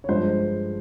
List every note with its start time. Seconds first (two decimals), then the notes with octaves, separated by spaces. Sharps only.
0.04 C#5
0.09 G2 F3 G#3 C5